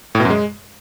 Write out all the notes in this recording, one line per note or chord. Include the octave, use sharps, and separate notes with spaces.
A2
B2
F#2
G#3